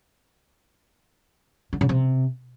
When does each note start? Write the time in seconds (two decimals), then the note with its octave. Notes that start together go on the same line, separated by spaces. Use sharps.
1.73 D3
1.81 C#3
1.89 C3